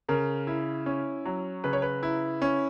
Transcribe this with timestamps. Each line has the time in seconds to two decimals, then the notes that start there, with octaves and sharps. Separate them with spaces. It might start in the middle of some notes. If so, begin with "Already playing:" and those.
0.09 C#3 A#4
0.47 E4
0.86 C#4
1.25 F#3
1.64 C#3 B4
1.73 C#5
1.82 B4
2.03 E4
2.42 C#4